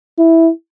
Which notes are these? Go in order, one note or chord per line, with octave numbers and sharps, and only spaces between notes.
E4